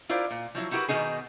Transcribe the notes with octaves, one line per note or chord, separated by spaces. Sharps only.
E4 F4 A#4 C5 D5
A#2
F3 F#3 E4
D#4 E4 F#4 G4 A#4 B4
B2 D#3 G3 B3 D#4 G#4